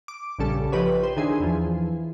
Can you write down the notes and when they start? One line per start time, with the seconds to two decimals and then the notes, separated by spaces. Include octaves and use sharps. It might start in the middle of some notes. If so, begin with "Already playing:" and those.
0.08 D6
0.39 A#1 G2 C#3 G3 A4
0.72 F3 D#4 G4 B4 C#5
1.03 C5
1.17 D#3 D4 E4 G#4
1.40 E2 E3 F3